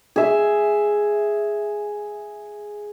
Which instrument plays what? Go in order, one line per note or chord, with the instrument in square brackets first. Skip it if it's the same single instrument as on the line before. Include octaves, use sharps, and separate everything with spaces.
[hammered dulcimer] G#4 E5